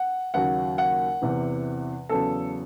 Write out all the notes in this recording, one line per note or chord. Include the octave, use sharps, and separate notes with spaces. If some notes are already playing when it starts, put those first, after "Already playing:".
Already playing: F#5
D#2 C#3 F#3 F#5
F#5
E2 C3 E3
E2 C#3 F#3 A4